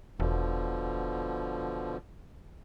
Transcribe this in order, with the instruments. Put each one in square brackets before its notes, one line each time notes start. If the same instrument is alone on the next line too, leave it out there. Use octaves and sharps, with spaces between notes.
[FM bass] E1 [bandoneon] B2 D3 F3